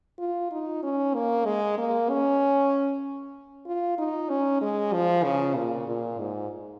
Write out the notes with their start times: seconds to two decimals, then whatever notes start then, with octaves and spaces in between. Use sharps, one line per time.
0.19 F4
0.52 D#4
0.83 C#4
1.14 A#3
1.45 G#3
1.78 A#3
2.09 C#4
3.66 F4
3.98 D#4
4.29 C#4
4.61 G#3
4.93 F3
5.24 C#3
5.55 A#2
5.88 A#2
6.19 G#2